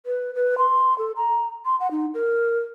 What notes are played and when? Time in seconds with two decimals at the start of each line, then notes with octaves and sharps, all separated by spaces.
0.06 B4
0.35 B4
0.58 C6
0.98 A4
1.16 A#5
1.65 C6
1.80 F#5
1.91 D#4
2.14 A#4